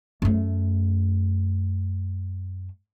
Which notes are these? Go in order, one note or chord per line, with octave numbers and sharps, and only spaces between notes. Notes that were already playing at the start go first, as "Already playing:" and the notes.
F#2 A3